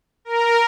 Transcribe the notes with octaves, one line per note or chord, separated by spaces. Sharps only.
A#4